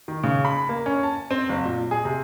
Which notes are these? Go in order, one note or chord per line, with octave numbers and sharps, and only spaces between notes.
D#3
C#3
B5
A#3
C#4
A5
C4
F#1
A#2
G#4
C3